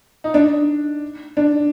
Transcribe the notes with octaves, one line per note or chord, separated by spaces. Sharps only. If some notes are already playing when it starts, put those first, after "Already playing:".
D#4
D4
D4